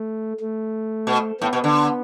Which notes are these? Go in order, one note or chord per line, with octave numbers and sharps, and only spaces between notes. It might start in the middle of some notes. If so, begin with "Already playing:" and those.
Already playing: A3
A3
B2
A2 B3
B2
D3